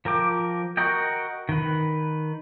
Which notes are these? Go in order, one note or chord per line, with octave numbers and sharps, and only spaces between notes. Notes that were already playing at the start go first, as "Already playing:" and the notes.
F3 A#4 G5 D6
F#4 A#4 D#5 G5
D#3 B4